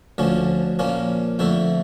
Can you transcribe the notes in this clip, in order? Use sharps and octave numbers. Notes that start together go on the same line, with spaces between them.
D2 D3 F3 C#4
A#2 F3 A#3 C#4
F2 D3 A3 E4